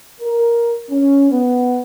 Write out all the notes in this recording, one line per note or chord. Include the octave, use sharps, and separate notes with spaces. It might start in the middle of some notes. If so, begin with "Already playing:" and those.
A#4
C#4
B3